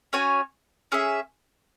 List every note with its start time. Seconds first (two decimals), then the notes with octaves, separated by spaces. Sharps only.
0.13 C#4 F#4 C#5 G#5
0.92 C#4 G#4 E5